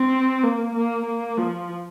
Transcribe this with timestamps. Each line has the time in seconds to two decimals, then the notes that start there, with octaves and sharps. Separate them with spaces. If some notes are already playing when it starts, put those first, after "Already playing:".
Already playing: C4
0.43 A#3
0.74 A#3
1.06 A#3
1.37 F3